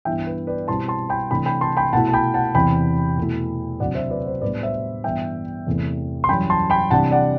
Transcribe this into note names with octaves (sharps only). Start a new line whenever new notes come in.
G2 E3 B3 E4 E5 G5
B4
B4 D5
B2 G3 C4 E4 A5 C6
A5 C6
G5 B5
C3 E3 A3 D4 G5 B5
G5 B5
A5 C6
G5 B5
B2 A3 E4 F#5 A5
A5
G5 B5
F#5 A5
E2 C3 E3 G5 B5
B2 A3 E4
D2 C3 F#3 C4 D5 F#5
C5 E5
B4 D5
C5
A2 G3 B3 D4 B4 D5
C5 E5
G2 E3 B3 D4 E5 G5
E2 C3 E3 A3
C6
F#2 E3 G3 G5 B5
A5 C6
G5 B5
C3 E3 G3 D4 F#5 A5
D5 F#5